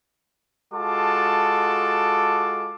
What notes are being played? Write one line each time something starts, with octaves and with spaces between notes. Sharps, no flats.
G#3 F4 F#4 A4 A5 D6